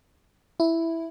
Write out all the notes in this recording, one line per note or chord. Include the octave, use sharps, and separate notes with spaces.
E4